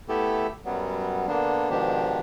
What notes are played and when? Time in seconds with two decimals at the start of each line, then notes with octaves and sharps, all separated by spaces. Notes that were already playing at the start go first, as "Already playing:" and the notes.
0.09 A3 B3 E4 G4 A4
0.65 F#2 F#3 G3 B3
1.28 D3 A#3 B3 D4
1.70 G#2 B2 D#3 F3 D4 G4